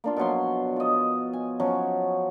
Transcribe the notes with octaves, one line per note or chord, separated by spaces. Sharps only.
A#3 D4 F4
B2 F3 F#3 C6
F4 D#5
G#5
F3 F#3 C#4